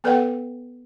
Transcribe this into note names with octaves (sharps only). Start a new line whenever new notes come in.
B3 A4 B4 D5 F#5 G5